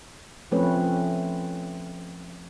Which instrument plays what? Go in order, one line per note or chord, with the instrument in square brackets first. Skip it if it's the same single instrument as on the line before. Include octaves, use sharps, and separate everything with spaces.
[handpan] F3 A3 C4 C#4 B4 C#5